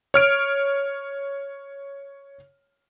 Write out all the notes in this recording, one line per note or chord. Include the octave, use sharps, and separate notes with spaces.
C#5 F6 D7